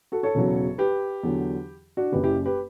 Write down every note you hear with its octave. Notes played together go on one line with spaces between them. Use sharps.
F#4 A4
A4 C#5
E1 E2 C#3 F#3
G4 B4
E2 D3 F#3
D4 F#4
F#1 F#2 C#3 G4 B4
E4 G4
G4 B4